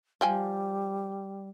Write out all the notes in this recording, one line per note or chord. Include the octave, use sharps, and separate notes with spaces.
F3 G3 G5 G#5